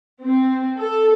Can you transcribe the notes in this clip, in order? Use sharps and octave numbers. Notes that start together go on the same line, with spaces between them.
C4
A4